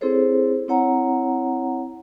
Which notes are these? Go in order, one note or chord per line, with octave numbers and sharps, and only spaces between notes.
C4 E4 G#4 A4 C5 C#5
C4 E4 C#5 F#5 A#5